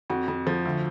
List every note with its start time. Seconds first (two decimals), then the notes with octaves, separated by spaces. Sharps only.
0.10 F2 F#4
0.28 F2
0.47 F3
0.65 D2